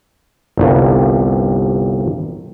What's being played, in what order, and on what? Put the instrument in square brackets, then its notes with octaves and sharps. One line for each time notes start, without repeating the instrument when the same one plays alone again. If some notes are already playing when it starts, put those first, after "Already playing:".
[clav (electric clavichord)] G1 C2 G2